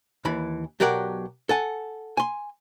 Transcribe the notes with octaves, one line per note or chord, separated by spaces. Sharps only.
D#2 E3 B5
B1 F#3 G4 A#4 D5 F#5
A4 F#5 G#5
G#5 C6